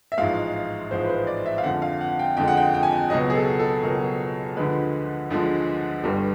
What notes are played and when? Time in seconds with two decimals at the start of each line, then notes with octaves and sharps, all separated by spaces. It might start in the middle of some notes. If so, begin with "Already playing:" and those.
0.12 E5
0.18 A1 G#2 F3 G#3 F5
0.91 A1 G#2 F3 G#3 C5
1.05 B4
1.09 C5
1.27 D5
1.46 E5
1.58 F5
1.64 F2 D3 F3 G#3 F#5
1.82 F5
2.01 F#5
2.19 G5
2.37 F2 D3 F3 G#3 G5
2.48 F#5
2.57 G5
2.74 G5
2.83 G#5
2.92 G5
3.10 C#2 B2 F#3 D#5
3.30 G#4
3.35 A4
3.60 A4
3.83 C#2 B2 F#3 A#4
4.57 D2 D3 F3 G#3 B4
5.30 D2 D3 F3 G#3
6.03 G1 G2 D3 G3